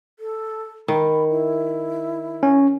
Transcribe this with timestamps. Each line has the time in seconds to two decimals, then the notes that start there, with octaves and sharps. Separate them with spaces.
0.19 A4
0.88 D#3 B5
1.29 E4
2.43 C#4